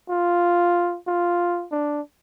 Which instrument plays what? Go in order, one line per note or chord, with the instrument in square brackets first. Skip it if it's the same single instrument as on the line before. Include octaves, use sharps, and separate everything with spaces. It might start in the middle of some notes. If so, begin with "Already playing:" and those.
[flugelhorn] F4
F4
D4